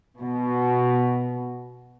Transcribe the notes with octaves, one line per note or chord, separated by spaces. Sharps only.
B2